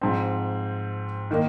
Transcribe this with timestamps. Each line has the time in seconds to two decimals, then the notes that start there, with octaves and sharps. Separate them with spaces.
0.01 G#2 F3 C4
1.31 D#3 A#3 D#4